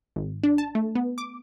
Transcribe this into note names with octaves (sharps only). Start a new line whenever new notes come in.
G#1
D4
A5
A3
B3
D6